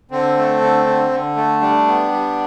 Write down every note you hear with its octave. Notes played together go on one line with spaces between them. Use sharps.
D3 C4
A3
D3
D3
D3
A3
G3 D4
B3
G3